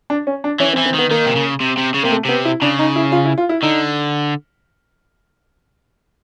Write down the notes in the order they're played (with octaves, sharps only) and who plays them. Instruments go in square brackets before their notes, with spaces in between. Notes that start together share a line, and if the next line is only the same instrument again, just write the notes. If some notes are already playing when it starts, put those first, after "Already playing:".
[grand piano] D4
C#4
D4
[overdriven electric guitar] E3 [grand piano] C#4
[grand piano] C4
[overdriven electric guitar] E3
[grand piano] C4
[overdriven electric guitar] D#3 [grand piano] B3
[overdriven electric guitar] D#3 [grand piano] A#3
[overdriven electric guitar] C3
C#3
C3
C3
C#3
[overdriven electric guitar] C3 [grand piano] A#3
[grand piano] A3
[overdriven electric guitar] C3 [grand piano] B3
[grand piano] E4
[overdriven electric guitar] C#3 [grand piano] D4
[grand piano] D#4
E4
F4
E4
F4
E4
[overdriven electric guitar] D3 [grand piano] D#4